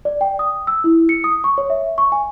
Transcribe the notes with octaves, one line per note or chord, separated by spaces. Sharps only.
D5
G5
D#6
E6
E4
C#7
D#6
C#6
C#5
E5
C#6
G#5